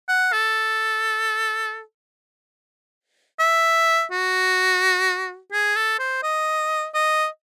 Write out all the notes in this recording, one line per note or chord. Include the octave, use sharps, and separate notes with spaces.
F#5
A4
E5
F#4
G#4
A4
C5
D#5
D#5